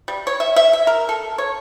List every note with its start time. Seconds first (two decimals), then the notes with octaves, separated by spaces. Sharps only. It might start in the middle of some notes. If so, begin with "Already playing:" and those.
0.08 G3
0.27 C#5
0.40 E5
0.56 E5
0.73 E5
0.87 A#4
1.09 A4
1.38 C#5